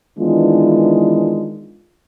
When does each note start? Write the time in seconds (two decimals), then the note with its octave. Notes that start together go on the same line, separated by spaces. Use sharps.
0.19 D#3 E3 G#3 B3 D4 F4